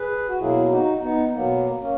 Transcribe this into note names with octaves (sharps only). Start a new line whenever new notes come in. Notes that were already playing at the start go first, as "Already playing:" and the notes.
Already playing: G#4 B4
F#4
B2 F#3 A#3 E4 G#4
D#4 F#4
B3 D#4
B2 F#3 A#3 B3
A#3 C#4